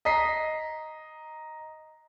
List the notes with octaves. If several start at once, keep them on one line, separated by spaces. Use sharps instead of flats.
D#5 A#5 B6 C7